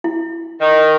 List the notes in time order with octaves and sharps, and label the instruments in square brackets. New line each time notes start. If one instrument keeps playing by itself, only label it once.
[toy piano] E4
[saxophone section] D#3